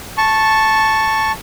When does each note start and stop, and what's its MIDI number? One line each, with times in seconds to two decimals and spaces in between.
0.18 1.32 81
0.18 1.32 85